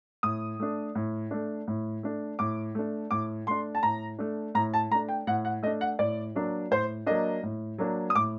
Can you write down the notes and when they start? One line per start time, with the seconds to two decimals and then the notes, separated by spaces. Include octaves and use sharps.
0.23 A2 D#6
0.59 A3 D4
0.95 A2
1.31 A3 D4
1.67 A2
2.03 A3 D4
2.39 A2 D6
2.75 A3 D4
3.11 A2 D6
3.47 A3 D4 C6
3.75 A5
3.83 A2 A#5
4.19 A3 D4
4.55 A2 A#5
4.74 A5
4.91 A3 A#5
4.94 D4
5.09 G5
5.27 A2 F#5
5.45 F#5
5.62 A3 D#5
5.66 D4
5.81 F#5
5.99 A2 D5
6.35 F#3 A#3 D4
6.71 A2 C5
7.06 F#3 A#3 D4 D#5
7.43 A2
7.78 F#3 A#3 D4
8.10 D#6
8.15 A2 D6